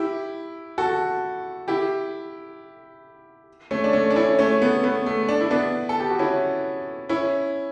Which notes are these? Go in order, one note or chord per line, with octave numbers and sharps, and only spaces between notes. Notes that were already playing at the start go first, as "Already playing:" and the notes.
Already playing: E4 G4
F#4 A4
E4 G4
A3 C#4
D4
A3 C#4
D4
C#4 E4
A3 C#4
B3
B3
A3
D4
E4
B3 D4
A4
G4
F#4
C#4 E4
C#4 E4